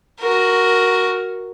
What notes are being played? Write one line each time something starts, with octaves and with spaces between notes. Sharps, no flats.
F#4 A#4